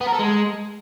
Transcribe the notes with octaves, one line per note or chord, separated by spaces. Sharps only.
B3
A#4
A4
G#3